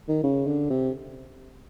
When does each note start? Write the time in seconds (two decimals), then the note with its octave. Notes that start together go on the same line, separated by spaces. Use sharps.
0.08 D#3
0.24 C#3
0.47 D3
0.70 C3